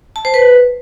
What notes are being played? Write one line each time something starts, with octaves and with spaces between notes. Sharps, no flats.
A5
C5
B4